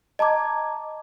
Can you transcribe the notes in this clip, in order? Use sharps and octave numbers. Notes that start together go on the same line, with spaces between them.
D#5 A5 A#5 D6 G#6